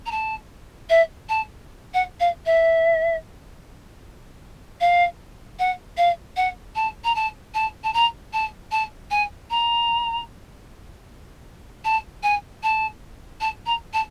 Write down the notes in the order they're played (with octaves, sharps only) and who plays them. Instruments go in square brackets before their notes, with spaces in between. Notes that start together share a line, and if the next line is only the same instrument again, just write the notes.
[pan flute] A#5
A5
E5
A5
F#5
F5
E5
F5
F#5
F5
F#5
A5
A#5
A5
A5
A5
A#5
A5
A5
G#5
A#5
A5
G#5
A5
A5
A#5
A5